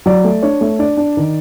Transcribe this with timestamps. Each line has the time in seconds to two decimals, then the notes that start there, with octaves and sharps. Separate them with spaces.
0.06 F#3 D5
0.24 A3
0.43 D4 C#5
0.61 A3
0.79 D4 D5
0.97 D4
1.17 D#3